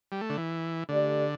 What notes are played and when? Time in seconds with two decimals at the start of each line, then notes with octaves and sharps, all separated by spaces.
0.12 G3
0.21 A3
0.30 D3
0.37 E3
0.89 D3 A3 G4 D5